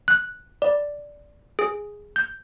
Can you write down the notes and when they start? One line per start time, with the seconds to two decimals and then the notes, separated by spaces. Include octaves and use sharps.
0.08 F#6
0.62 D5
1.59 G#4
2.16 G6